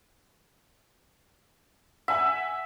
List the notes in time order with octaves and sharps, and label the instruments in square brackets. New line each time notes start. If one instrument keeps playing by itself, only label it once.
[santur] E5 [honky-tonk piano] F#5 G#5